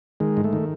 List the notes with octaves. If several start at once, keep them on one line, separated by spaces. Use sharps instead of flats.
D#3 G#3
G#2
A3
D#3